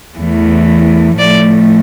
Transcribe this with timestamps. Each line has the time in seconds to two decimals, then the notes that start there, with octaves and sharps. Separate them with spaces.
0.19 E2 E3 A3
1.18 A2 F3 A3 D5